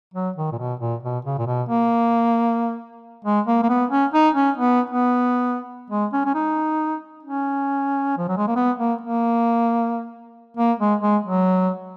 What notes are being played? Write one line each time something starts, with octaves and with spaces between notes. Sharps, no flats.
F#3
D#3
A#2
B2
A#2
B2
C#3
A#2
B2
A#3
G#3
A#3
A#3
B3
C#4
D#4
C#4
B3
B3
G#3
C#4
C#4
D#4
C#4
F3
F#3
G#3
A#3
B3
A#3
A#3
A#3
G#3
G#3
F#3